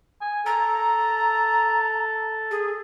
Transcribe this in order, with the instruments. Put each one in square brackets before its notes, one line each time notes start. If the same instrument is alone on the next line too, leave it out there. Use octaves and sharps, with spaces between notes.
[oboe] G#5
[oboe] A4 [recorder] A#5
[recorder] G#4